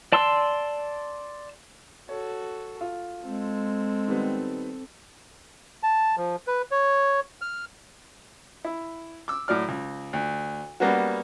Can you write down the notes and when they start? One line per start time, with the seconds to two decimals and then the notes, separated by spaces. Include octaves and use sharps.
0.12 D5 A5 C6 E6
2.09 F#4 A4 C#5
2.81 F4
3.23 G#3 C4 A4
4.08 D#3 G3 B3
5.83 A5
6.17 F3
6.47 B4
6.71 C#5
7.41 F6
8.65 E4
9.28 D6 E6
9.48 A2 F#3 D5 F6
9.68 C#2
10.13 D2
10.80 G3 A#3 B3 C#4 F#4